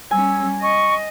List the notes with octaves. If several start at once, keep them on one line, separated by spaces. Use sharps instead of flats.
G3 C#4 G#5 E6
D#5 C#6